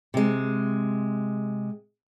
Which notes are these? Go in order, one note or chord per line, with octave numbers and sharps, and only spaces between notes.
C3 G#3